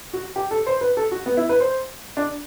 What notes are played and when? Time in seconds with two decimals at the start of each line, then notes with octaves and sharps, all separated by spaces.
0.13 F#4
0.36 G4
0.51 A4
0.67 C5
0.81 B4
0.97 A4
1.11 F#4
1.26 B3
1.37 E4
1.49 B4
1.60 C5
2.17 D4